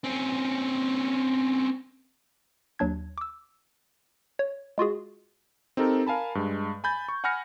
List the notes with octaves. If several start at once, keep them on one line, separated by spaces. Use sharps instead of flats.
C4 C#4
D#2 F#3 D4 G#6
D6 E6
C#5
G#3 F4 F#4 G#4
C4 D#4 G4 A4 A#4
A#4 F5 G#5 A5 B5
G2 G#3
G#5 B5 G6 A6
C#6
F#5 G#5 B5 F6 A#6 C#7